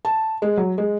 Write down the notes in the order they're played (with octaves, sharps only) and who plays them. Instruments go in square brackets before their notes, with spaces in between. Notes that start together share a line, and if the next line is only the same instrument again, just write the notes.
[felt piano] A5
G#3
F#3
G#3